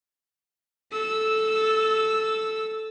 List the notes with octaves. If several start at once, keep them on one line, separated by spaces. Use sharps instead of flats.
A4 E6